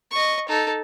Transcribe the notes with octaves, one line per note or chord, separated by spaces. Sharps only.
D#5 C#6
D#4 A4